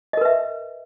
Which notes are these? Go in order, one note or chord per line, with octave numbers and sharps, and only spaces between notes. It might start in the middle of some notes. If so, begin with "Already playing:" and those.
A#4 B4 D#5 E5